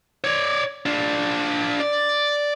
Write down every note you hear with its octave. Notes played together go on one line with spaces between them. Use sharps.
C#5 D5
D4 F4
D5